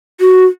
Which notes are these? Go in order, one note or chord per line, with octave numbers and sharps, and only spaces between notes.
F#4